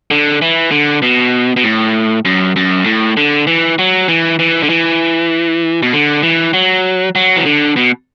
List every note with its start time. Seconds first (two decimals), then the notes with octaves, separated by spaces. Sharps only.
0.11 D3
0.42 E3
0.71 D3
1.03 B2
1.56 B2
1.64 A2
2.25 F#2
2.56 F#2
2.86 A2
3.17 D3
3.47 E3
3.79 F#3
4.08 E3
4.39 E3
4.63 D3
4.69 E3
5.82 B2
5.93 D3
6.23 E3
6.53 F#3
7.15 F#3
7.36 E3
7.46 D3
7.77 B2